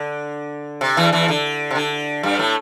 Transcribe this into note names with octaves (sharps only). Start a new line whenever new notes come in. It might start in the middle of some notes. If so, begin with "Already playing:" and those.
Already playing: D3
C3
E2 E3
E2 E3
D3
C3
D3
G2 G3
A2 A3